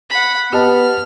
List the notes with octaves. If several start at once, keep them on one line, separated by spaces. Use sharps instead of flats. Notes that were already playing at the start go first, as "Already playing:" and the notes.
F#5 B5
B3 G4 D#5 A5 F6